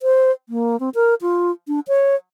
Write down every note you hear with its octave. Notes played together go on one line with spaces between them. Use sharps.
C5
A#3
C4
A#4
F4
D4
C#5